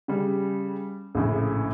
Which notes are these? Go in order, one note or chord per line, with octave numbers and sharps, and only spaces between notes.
C#3 G3
A#1 A2 C#3